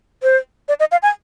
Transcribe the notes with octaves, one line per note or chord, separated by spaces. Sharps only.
C5
D5
D#5
F5
G#5